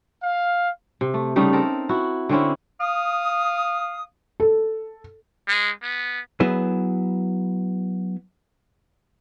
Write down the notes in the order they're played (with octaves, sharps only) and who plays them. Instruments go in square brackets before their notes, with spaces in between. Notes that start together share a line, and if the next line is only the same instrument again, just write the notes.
[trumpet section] F5
[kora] C3
A3
C#3 G3 A3 D#4
C4 A4 A#4
E4 F#4
D3 C4 C#4 E4
[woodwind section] F5 D#6
[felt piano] A4
[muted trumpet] G#3
B3
[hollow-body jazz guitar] F#3 B3 E4 G#4 B4